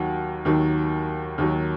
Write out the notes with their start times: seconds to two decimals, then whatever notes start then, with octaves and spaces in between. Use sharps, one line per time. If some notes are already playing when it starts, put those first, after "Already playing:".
Already playing: D#2 D#3 F#3 F#5
0.45 D#2 D#3 F#3
1.38 D#2 D#3 F#3